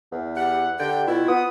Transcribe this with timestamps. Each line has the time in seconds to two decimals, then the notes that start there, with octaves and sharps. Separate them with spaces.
0.12 E2
0.37 G4 F#5
0.80 D3 G4 G5
1.07 B2 E4 F4
1.28 B3 D#6